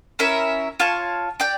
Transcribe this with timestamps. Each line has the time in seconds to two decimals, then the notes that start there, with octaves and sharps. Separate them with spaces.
0.19 C#4 E4 A#4 E5
0.80 F4 C#5 F5 A5
1.40 G4 D5 G5